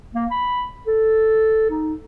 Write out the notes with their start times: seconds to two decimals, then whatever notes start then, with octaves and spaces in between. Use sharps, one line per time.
0.15 A#3
0.31 B5
0.87 A4
1.70 D#4